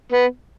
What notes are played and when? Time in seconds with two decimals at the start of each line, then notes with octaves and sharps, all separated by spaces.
0.12 B3